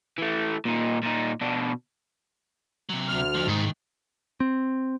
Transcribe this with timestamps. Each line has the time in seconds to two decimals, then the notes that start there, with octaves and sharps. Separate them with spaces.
0.18 E3 A3
0.65 A#2 D#4
1.02 A#2 D#4
1.41 B2 D4
2.89 C3 F#3
3.08 D2 F6
3.35 F2 F3
3.48 C2 G#2 D#3
4.40 C4